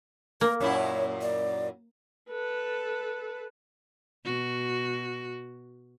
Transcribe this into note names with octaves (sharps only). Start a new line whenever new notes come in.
A#3 A#4
F#2 A#2 E4 C#5
D5
A4 B4
B2 F#4